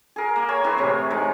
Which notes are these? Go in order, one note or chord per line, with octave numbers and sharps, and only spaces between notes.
G#4 A#4
A#3
A#4 C#5 G#5
E3 C4 G#4 B4
A2 C3 C#5
D#3 G#3